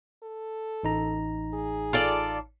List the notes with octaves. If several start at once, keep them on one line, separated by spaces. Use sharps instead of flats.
A4
A1 D#4 A#5
G#4
F4 A4 D5